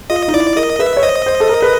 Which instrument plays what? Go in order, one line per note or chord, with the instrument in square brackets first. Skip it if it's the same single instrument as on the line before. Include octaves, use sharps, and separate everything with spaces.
[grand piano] F4 [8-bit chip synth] D#5
[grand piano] D#4
[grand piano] E4 [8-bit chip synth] D5
[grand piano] A#4 [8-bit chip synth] D#5
[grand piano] B4 [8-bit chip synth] E5
[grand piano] C#5
[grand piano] C5 [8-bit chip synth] D#5
[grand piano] C5
A4
A#4
B4